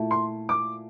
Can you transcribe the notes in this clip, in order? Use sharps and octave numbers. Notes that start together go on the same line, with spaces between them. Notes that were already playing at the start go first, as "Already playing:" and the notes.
Already playing: A#2 A3 E4
C6
D6